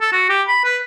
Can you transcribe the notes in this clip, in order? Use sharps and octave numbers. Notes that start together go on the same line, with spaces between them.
A4
F#4
G4
B5
B4